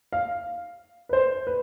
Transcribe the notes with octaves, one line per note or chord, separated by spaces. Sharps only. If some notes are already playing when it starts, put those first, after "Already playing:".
F5
B4
C5
B4